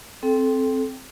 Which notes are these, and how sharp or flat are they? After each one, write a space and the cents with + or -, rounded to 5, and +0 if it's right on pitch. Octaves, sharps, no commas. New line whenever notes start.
C4 +0 A4 -20 G5 +0